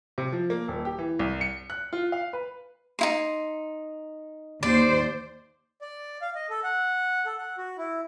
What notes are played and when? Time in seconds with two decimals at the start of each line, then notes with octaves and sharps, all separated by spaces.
0.18 C3
0.32 F3
0.50 A#3
0.68 D#1
0.85 G4
0.99 E3
1.19 C2
1.41 C#7
1.70 F#6
1.93 F4
2.12 F5
2.33 B4
2.99 D#4 E4 C6
4.63 D#2 C5 D5
5.81 D5
6.22 F5
6.35 D#5
6.50 A4
6.64 F#5
7.26 A4
7.38 F#5
7.58 F#4
7.78 E4